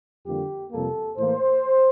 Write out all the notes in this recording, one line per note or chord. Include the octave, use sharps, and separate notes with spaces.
F2 D3 G3 A#3 G4
F2 C3 G3 A#3 A4
A2 E3 A#3 C5